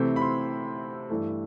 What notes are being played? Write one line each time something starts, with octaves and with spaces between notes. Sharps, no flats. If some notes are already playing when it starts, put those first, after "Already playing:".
Already playing: C3 E3 A3 C4 E4
B5
C6
G2 E3 A3